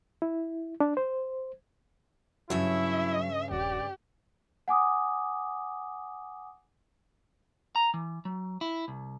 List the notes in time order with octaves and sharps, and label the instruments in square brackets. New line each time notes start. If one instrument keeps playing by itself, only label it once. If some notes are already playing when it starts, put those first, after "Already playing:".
[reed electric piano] E4
D4
C5
[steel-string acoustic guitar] G2 C#3 C#5 [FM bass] F#3 [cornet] E4 [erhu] E5
[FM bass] D#1 [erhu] G4 [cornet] D5
[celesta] F#5 G#5 D6 D#6
[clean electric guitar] A#5
E3
F#3
E4
C2